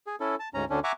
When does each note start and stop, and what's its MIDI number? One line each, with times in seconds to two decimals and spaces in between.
0.07 0.16 68
0.20 0.35 61
0.20 0.35 64
0.20 0.35 69
0.39 0.49 81
0.54 0.65 38
0.54 0.65 44
0.54 0.65 61
0.54 0.65 82
0.70 0.80 38
0.70 0.80 50
0.70 0.80 61
0.70 0.80 62
0.84 0.92 76
0.84 0.92 78
0.84 0.92 80
0.84 0.92 82
0.84 0.92 85
0.84 0.92 86